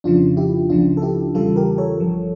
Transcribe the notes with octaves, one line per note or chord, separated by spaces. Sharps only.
F2 C#3 F3 D4 F4
E4 G4
C#2 C#3 F3 D4 F4
A4
E4 G4
E2 C#3 E3 G3 F4 A4
G4 A#4
A4 C#5
G1 G2 F3